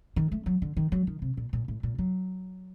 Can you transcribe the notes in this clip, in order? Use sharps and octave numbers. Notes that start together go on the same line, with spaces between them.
D#3
A3
F#3
D3
D#3
F#3
D#3
C3
A#2
A#2
A2
A#2
F#3